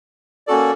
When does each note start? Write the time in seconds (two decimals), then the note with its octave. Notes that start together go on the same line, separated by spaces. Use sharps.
0.47 A#3 C#4 F#4 A4 D5